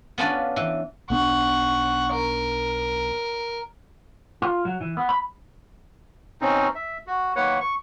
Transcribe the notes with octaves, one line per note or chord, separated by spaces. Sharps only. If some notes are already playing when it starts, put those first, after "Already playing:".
B3 C#4 D4 F4 B4 D5
E3
B1 B3 D4 F#5 C#6
A#4
F4
F#3
E3
B3
B5
B2 C4 C#4 D#4
E5
F#4
D#3 A#3 B4 C#5 F#5
C#6